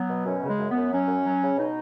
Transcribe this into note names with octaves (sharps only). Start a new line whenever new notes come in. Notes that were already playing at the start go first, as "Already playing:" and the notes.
Already playing: F#3 B3
B2
F#2 C#4
C#3
G#3
F#2
B3
F#2
F#3 C#4
F#2
F#3
C#3
B2 D#4